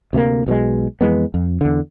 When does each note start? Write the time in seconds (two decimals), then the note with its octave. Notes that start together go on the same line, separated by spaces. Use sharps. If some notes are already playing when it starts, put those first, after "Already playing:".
0.13 D2 C3 A3 A#3
0.46 B1 B2 F3 G#3
1.01 F2 E3 G#3 B3
1.34 F2
1.61 E2 D3